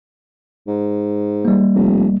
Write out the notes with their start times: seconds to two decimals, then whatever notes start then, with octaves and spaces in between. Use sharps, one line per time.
0.68 G#2
1.45 G3 A#3
1.75 F1